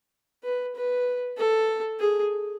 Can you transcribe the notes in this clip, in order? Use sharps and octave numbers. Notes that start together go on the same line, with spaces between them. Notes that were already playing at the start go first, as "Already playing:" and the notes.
B4
B4
A4
G#4